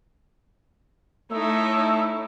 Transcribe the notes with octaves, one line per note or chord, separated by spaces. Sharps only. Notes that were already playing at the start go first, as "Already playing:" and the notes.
A3 D#4 E4 C#5 E6